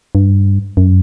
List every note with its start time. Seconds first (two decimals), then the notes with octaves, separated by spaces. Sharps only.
0.15 G2
0.77 F#2